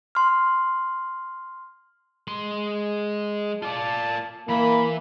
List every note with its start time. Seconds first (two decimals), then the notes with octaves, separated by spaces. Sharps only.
0.15 C6 F6
2.28 G#3 C6
3.63 F4 D5 A5
4.49 E3 A#3 B5